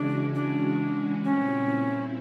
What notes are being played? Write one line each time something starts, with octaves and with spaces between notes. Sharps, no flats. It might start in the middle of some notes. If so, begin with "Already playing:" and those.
Already playing: C#3 E3 G#3 C#4 D4 F#4
D4
A#2 G3 C4 C#4 E4